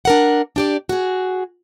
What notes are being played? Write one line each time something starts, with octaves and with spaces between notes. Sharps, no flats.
D4 A#4 F#5
D4 G4 D5
F#4 G#4